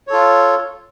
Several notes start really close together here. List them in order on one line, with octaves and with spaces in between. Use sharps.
C#5 A4 F4